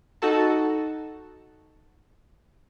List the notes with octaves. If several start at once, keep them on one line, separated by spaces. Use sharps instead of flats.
D#4 F#4 A4 A5